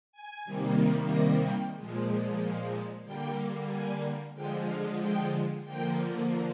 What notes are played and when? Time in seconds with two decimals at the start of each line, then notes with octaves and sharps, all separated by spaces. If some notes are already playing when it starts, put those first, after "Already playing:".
0.12 G#5
0.45 C3 D#3 G3 A#3
1.09 A#5
1.42 G5
1.75 A#2 F3 G#3
3.04 D3 G3 A#3 G5
3.69 G#5
4.34 D3 F3 G#3 G5
4.67 F5
4.99 G5
5.64 D3 F3 A#3 G5